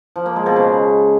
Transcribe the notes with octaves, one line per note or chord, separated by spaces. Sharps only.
F3
A#3
G#3
B2
C#3